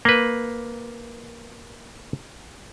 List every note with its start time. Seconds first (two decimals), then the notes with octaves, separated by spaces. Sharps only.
0.05 A#3 B4